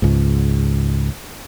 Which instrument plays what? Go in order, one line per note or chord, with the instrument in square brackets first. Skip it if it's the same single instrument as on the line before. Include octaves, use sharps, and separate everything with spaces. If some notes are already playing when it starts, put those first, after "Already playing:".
[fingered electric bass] C#2 G#2